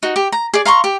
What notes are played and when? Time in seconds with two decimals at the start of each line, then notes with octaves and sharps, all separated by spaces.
0.03 D#4 F#4
0.16 G4
0.32 A#5
0.54 G#4 D5
0.65 F5 A#5 C6 C#6
0.84 G4